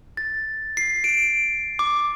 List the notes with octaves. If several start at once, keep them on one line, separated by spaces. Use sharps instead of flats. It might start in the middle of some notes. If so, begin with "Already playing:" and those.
A6
C7
D7
D6